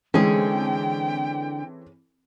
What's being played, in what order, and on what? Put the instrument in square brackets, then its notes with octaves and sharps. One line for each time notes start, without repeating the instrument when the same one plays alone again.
[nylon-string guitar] D3 G#3 [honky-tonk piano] E3 C4 A4 [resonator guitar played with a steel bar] C#4 G#4 [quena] G5